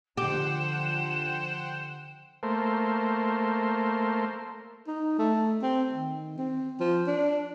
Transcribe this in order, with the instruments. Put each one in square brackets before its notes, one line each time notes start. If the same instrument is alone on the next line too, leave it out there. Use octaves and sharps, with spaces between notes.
[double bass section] D3 F3 [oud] G4 [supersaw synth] C5 F#5 G5 [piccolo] E7
[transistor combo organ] A3 A#3 C5
[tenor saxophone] D#4
A3
C4
D#3
C4
F3
D4